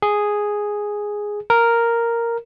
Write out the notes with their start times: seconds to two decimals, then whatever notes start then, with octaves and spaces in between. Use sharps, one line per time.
0.02 G#4
1.50 A#4